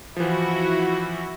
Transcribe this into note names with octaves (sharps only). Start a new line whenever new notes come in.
E3 F3 E4 F#4